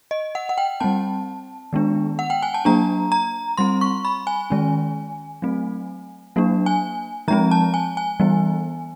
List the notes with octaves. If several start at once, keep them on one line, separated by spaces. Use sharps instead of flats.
D#5
F#5
F#5
G5
G3 C4 A5
D#3 G#3 B3 D4
F#5
G5
G#5
A5
F#3 A#3 D4 A#5
A#5
G3 C4 C6
C#6
B5
G#5
D#3 G#3 C#4
F#3 A3 C4
F#3 A#3 D4
G#5
F3 G#3 C4 A#5
A5
G#5
G#5
E3 G3 B3